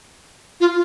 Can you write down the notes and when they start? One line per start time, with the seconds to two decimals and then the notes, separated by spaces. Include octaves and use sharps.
0.60 F4